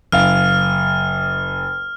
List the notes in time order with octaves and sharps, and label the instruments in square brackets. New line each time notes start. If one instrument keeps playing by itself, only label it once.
[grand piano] F#1 F5 [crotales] F6